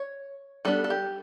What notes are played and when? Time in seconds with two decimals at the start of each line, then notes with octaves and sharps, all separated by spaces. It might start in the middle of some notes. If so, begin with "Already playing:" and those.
Already playing: C#5
0.65 G3 B3 D4 A4
0.84 A4
0.90 G4